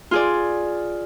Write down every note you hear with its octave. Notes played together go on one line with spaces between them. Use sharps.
F4 G#4 D5